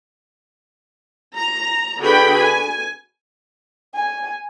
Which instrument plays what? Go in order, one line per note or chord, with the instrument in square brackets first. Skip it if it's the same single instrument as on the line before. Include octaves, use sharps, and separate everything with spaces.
[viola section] A#5
D3 F#4 G#4 B4 G5 B5
G#5
[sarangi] G#5